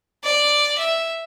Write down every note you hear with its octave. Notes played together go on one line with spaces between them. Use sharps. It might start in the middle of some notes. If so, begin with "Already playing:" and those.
D5
E5